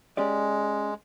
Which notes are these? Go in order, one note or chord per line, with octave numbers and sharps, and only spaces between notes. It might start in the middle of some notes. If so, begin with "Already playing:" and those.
G#3 C#4 G4 D5